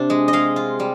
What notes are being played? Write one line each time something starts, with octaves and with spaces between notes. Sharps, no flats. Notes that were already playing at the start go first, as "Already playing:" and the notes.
Already playing: C3 D4
G#3
D#5
G#3 F5
F4
G3